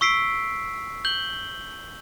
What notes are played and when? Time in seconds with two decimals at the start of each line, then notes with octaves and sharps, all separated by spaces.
0.01 C#6 E6 B6 C7 D7
1.05 G6 F#7 G7